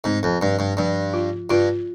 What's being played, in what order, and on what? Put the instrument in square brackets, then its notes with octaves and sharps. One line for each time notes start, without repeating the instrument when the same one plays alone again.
[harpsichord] G#2 [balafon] C4
[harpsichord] F2
[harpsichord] G2 [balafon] F3
[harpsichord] G2
[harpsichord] G2 [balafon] F3
[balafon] F4
[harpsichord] G2 [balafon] F4